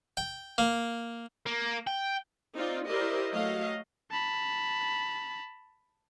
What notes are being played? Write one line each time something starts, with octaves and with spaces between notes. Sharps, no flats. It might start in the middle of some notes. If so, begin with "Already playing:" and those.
G5
A#3
A#3
G5
C4 D#4 F4 D5
E4 G4 A#4 C5 D5 D#5
F#3 A3 D#5 F5
A5 B5